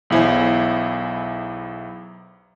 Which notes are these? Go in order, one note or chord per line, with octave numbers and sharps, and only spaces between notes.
B1 E2 E4 C5 G#5